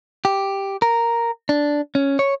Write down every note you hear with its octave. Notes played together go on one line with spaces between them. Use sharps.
G4
A#4
D4
C#4
C#5